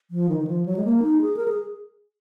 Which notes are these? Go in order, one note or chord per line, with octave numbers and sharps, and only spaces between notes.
F3
D#3
D#3
F3
F#3
G#3
A#3
D#4
G#4
A#4
G#4